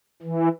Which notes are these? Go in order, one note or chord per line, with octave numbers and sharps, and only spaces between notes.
E3